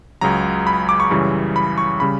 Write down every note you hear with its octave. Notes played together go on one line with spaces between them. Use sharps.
C#2 C#3 F#3 A#5
B5
D6
C#6
F#2 C#3 E3 G3
B5
C#6
C#3 G3 B5